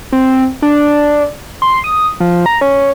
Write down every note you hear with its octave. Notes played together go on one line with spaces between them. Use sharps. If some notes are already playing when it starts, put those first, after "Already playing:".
C4
D4
C6
D#6
F3
A#5
C#4